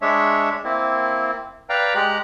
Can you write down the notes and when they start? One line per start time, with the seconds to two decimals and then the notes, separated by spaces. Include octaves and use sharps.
0.02 G#3 D4 C#5 E5
0.64 A#3 C4 E4
1.69 B4 D5 F5 G5 A#5
1.95 G#3 G4 A#5 F#6